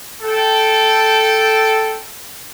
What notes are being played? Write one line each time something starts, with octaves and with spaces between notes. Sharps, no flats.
A4 G5